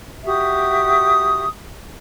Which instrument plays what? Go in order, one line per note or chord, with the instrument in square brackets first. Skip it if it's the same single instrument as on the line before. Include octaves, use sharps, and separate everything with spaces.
[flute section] F#4 G4 E5 D#6